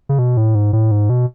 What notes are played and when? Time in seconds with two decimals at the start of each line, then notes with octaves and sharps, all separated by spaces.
0.09 C#3
0.19 B2
0.37 A2
0.55 G#2
0.73 A2
0.91 G#2
1.10 B2